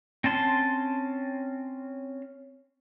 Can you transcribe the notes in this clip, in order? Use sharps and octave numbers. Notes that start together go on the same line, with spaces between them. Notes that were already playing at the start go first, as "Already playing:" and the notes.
C4 C#4 A5 C6